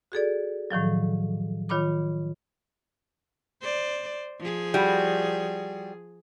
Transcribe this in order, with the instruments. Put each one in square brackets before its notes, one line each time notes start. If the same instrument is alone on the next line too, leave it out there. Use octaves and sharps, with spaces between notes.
[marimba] F#4 G#4 A4 D5
A2 D#3 F3 F#3
D#3 F4 C#5 B5 D6
[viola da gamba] C5 D5
F3 G#4
[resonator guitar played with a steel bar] G3 F#4